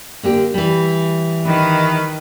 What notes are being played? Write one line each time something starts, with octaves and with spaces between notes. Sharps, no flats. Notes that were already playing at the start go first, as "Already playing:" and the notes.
D3 A#3 G4
E3 G3
D#3 B4